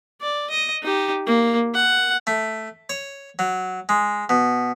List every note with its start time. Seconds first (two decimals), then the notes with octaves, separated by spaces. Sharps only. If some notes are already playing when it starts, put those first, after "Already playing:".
0.21 D5
0.50 D#5
0.83 D#4 G4
1.27 A#3
1.74 F#5
2.27 A3
2.89 C#5
3.39 F#3
3.89 G#3
4.29 B2